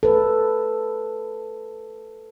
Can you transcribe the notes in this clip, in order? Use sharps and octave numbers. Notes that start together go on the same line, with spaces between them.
A4 B4